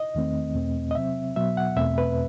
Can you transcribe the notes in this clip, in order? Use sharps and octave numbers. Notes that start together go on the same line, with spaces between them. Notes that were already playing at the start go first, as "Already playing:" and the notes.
Already playing: D#5
E2 D#3 A3 C4
E2 B2 A3 C4
D#5
C3 F#3 C4 E5
B2 F#3 B3 E5
F#5
E2 B2 A3 C4 E5
B4